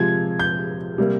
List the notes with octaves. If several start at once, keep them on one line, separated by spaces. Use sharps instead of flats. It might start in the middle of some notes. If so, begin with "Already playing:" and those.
Already playing: C3 F3 G#3 G#6
G6
C3 G3 A#3